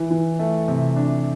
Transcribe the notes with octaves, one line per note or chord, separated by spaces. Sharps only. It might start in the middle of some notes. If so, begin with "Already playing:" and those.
Already playing: E3
E3
A3
C3
D4